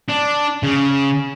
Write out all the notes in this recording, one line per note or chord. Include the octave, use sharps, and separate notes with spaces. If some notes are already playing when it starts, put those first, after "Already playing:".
D4
C#3